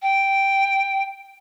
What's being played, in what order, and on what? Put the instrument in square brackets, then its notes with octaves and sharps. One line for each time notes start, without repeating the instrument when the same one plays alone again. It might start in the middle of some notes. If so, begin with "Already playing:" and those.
[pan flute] G5